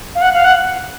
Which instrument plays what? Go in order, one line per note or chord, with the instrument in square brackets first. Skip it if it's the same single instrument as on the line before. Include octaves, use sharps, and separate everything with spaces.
[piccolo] F5
F#5
F5
F#5